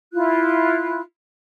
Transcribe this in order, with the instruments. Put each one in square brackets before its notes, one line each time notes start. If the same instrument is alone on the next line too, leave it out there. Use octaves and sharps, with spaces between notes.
[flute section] E4 F4 F#6